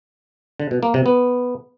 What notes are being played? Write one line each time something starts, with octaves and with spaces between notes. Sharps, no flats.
D3
B2
A#3
C3
B3